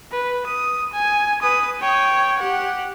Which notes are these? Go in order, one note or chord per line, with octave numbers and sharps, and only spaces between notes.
B4
D#6
G#5
B4 D#6
C#5 G5
G4 F#5